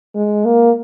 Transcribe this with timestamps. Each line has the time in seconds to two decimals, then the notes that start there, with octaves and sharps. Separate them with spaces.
0.15 G#3
0.45 A#3